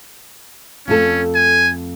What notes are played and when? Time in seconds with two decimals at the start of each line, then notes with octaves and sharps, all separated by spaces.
0.88 F2 A3 C#4 A4
1.35 G#5